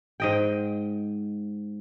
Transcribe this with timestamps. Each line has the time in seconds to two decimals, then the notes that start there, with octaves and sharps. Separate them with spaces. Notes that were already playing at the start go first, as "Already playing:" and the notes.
0.20 G#2 D#5 G5